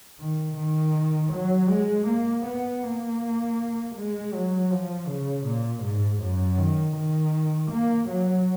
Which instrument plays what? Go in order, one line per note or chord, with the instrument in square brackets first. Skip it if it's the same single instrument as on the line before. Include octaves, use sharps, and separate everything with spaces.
[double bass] D#3
D#3
F#3
G#3
A#3
B3
A#3
G#3
F#3
F3
C#3
A#2
G#2
F#2
D#3
D#3
A#3
F#3